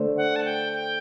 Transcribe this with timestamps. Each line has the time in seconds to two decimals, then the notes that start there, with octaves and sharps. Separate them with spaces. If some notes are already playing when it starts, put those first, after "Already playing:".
Already playing: D3 A3 D4 A4 C5
0.17 F#5
0.36 A5
0.45 G5
0.73 G5